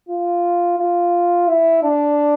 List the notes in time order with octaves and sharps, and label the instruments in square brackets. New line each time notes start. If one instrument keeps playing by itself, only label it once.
[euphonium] F4
F4
E4
D4